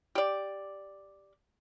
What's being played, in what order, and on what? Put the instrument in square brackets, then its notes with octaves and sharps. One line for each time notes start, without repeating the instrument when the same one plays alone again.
[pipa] G4 D5